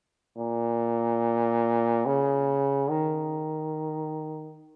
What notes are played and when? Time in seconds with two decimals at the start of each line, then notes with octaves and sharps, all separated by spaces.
0.38 A#2
2.06 C#3
2.90 D#3